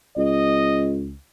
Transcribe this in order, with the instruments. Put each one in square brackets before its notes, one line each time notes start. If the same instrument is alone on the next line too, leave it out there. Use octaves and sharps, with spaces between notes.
[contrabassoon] C#2 [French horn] D#5